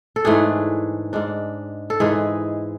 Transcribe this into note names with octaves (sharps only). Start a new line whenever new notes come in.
A4
G#2 E3 A3 D4 G#4
G#2 G#3 D4
A4
G#2 E3 G#3 G#4